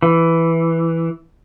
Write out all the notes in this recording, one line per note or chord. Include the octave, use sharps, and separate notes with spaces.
E3